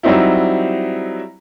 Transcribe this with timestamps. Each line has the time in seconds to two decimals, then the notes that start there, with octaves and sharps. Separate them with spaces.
0.03 F#3 G3 C4 D#4 E4